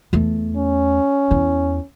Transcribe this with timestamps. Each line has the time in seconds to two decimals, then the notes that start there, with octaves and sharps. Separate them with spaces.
0.13 E2 A3
0.57 C#4
1.31 E2 E4